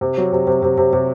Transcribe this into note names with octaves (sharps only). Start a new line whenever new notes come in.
C3
F#3
C3
C3
C3
C3
C3